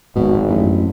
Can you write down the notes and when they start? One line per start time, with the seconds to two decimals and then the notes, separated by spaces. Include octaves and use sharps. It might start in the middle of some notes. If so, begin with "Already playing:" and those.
0.16 D1 G#1 G#2 B2 F3
0.48 A1 F#2 A3